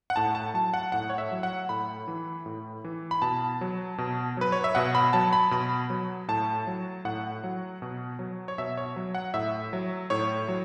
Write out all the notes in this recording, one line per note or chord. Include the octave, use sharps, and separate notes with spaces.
F#5
A2 A5
A5
F#3 A5
F#5
A2 F#5
C#5
E5
F#3
F#5
A2 B5
E3
A2
E3
B5
B2 A5
F#3
B2
F#3 B4
C#5
E5
B2 F#5
B5
F#3 A5
B5
B2 B5
F#3
A2 A5
F#3
A2 F#5
F#3
B2
F#3
C#5
B2 E5
C#5
F#3
F#5
A2 E5
F#3
A2 C#5
F#3